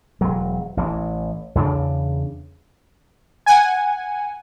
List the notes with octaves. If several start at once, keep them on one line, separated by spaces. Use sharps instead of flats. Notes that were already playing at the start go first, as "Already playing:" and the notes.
E1 F#3
A1 E3
E2 C#3 D4
F#5 G#5